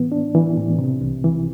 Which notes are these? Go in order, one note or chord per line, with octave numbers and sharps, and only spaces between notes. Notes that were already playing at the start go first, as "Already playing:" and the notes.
Already playing: A2 E3 B3
D4
E3
A2
C3
C2
E3